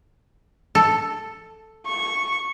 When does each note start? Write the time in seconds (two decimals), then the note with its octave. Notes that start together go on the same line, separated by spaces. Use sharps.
0.75 A4
1.87 C#6